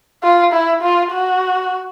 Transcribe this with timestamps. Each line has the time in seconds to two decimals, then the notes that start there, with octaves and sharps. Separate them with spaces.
0.23 F4
0.53 E4
0.82 F4
1.12 F#4